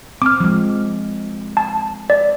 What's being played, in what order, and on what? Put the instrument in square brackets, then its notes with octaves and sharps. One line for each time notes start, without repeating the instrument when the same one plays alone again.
[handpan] C4 [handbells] D6 F6
[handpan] F3 G#3
[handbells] A5
D5